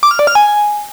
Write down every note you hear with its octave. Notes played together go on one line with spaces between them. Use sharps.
D6
F6
D5
F6
G#5